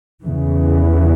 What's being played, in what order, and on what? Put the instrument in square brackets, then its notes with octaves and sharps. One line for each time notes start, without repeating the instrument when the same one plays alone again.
[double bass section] E2 C#3 E3